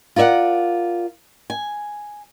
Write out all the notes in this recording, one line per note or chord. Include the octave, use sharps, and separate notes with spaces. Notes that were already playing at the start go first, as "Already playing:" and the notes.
F4 A#4 D5 E5 F#5
G#5